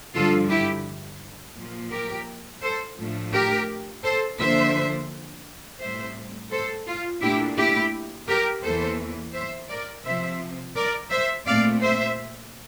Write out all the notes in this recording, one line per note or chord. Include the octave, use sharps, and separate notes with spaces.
G2 D3 F3 F4 A4
E4 G4
A#2 F3 A#3
G4 A#4
A4 C5
A2 F3 A3 D4
G4 A#4
A4 C5
D3 F3 A#3 D4 C5 E5
A2 G3 C4 C5 E5
A4 C5
F4
A#2 A3 D4 E4 G4
E4 G4
G4 A#4
E2 E3 A#3 A4 C5
C5 E5
A#4 D5
C3 F3 C4 C5 E5
A#4 D5
C5 E5
A#2 A3 C4 D5 F5
C5 E5